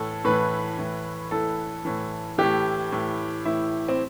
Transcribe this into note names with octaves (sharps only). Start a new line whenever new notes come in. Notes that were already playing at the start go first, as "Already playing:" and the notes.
Already playing: A2 E3 A4
A2 E3 B4
A2 E3
A2 E3 A4
A2 E3
A2 E3 G4
A2 E3
A2 E3 E4
C4